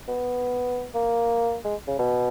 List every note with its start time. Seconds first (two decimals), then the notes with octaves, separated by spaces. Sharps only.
0.08 B3
0.95 A#3
1.65 G#3
1.87 C#3
1.99 B2